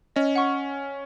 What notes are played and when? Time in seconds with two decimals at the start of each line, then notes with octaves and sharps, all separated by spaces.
0.16 C#4 D#5
0.36 F#5 C#6